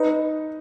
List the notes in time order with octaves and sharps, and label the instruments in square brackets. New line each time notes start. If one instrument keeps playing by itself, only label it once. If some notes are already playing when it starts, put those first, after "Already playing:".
Already playing: [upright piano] D#4 [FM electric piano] B4